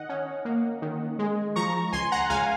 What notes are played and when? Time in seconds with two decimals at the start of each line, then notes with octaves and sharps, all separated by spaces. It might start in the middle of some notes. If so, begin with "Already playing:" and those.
Already playing: D#3 D#5 F#5
0.09 C#4
0.45 A#3
0.82 D#3
1.19 G#3
1.56 F3 A#5 C#6
1.92 C#2 G#5 C6
2.12 F#5 A#5
2.30 C#2 F5 G#5